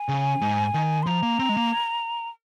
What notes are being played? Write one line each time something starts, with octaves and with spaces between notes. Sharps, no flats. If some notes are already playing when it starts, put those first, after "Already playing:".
Already playing: G#5
C#3
G#2
D#3
C6
F3 A#5
A#3
C4
G#3
A#3